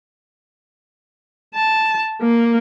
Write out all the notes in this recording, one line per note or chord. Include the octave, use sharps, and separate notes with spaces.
A5
A#3